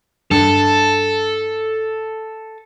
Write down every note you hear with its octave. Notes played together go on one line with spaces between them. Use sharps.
G2 A4